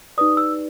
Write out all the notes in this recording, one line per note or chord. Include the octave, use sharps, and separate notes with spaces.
D#4 G4 B4 D5 D#6
E6